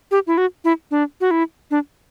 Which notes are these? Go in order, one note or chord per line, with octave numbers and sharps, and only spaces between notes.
G4
E4
F#4
E4
D4
F#4
E4
D4